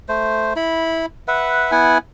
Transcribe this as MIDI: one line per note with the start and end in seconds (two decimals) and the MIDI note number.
0.09 0.54 57
0.09 0.54 72
0.56 1.06 64
0.56 1.06 83
1.28 1.71 71
1.28 1.71 76
1.28 1.71 78
1.71 1.98 59
1.71 1.98 64
1.71 1.98 78
1.71 1.98 80